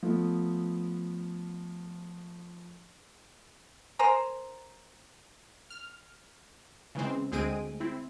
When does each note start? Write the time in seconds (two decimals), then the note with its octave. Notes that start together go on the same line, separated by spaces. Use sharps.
0.03 F3 A3 B3
3.99 A#4 C5 G#5 A#5
5.70 F6
6.95 C#3 E3 G#3 C4
7.32 D2 G#3 C4 G#4 D7 D#7
7.80 C4 E4